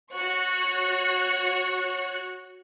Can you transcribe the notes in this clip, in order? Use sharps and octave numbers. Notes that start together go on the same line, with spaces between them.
F#4 C#5 C#6 F#6 C#7